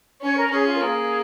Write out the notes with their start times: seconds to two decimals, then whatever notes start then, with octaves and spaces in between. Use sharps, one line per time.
0.21 C#4 C#5
0.36 A#4
0.51 C#4 G#4
0.66 F4
0.76 A#4
0.81 A#3 G#4